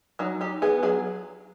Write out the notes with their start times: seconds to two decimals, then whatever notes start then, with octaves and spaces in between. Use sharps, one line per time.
0.19 F#3 D#4
0.41 D#4 G4
0.62 B3 G#4
0.83 F#3 G#4